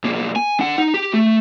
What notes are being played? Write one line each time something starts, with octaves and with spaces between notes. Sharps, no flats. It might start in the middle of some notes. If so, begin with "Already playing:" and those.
B1 A#3
G#5
D4 F#5
D#4
G4
A3